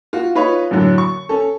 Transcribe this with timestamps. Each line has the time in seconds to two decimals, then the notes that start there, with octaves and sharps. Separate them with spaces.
0.13 F4 F#4
0.35 D#4 F4 B4 C#5
0.71 F#2 A2 D3 F#3
0.98 C#6
1.29 C#4 A4